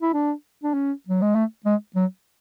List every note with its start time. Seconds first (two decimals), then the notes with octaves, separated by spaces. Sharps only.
0.02 E4
0.14 D4
0.63 D4
0.74 C#4
1.09 F#3
1.22 G#3
1.35 A3
1.66 G#3
1.96 F#3